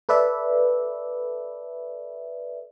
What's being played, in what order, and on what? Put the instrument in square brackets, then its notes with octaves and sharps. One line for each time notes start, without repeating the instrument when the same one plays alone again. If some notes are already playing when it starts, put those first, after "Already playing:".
[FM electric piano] A4 B4 D5 E5